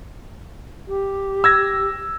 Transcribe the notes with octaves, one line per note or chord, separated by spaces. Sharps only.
G4
E6 G#6 A#6